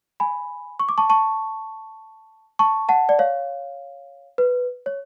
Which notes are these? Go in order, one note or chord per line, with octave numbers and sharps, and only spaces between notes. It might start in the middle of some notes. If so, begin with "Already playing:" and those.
G#5 B5
C#6
D6
A5 C#6
A5 C#6
A5 C#6
F#5 A5
D5
C#5 F5
B4
C#5